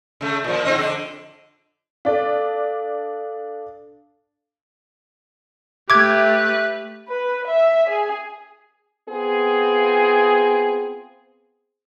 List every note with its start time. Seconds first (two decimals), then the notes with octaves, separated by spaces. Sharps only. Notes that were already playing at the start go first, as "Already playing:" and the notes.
0.21 C#3 A3
0.44 A#2 F3
0.64 G#2 C4 D#5
0.78 F2 D3 D4
2.05 D4 A4 D5 F5
5.90 A3 G4 B4 E5 D6 G#6
7.08 B4
7.46 E5
7.89 G#4
9.10 B3 C4 F4 G#4